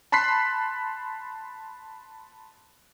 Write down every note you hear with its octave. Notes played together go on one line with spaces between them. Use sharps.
A5 B5 C6 F#6 B6 C7